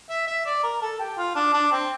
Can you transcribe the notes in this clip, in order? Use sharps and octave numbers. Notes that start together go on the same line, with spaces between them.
E5
E5
D5
A#4
A4
G4
F4
D4
D4
C4